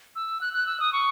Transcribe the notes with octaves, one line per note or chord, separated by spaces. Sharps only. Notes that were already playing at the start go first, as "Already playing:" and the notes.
E6
F#6
F#6
E6
D#6
C#6